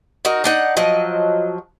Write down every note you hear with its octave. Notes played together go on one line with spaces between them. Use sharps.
D#4 F#4 A#4
D4 D#4 F#5
F3 F#3 D#5